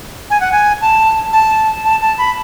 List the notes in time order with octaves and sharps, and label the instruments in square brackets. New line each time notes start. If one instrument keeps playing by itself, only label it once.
[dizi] G#5
F#5
G#5
A5
A5
A5
A5
B5